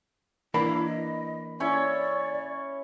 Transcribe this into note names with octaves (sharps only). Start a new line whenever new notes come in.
E3 A#3 D4 E4 B5
D#5
C#4 E4 C#5 D5